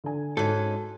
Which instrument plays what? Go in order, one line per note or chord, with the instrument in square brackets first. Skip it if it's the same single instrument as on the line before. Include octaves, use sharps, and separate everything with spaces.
[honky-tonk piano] D3 D4 G#5
[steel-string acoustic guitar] G#2 C#4 [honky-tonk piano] F#4 [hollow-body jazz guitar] A4